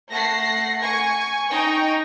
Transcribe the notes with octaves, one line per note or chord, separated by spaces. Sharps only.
A3 F#5 A#6 C7
G#5 C#6
D#4 G5 C#6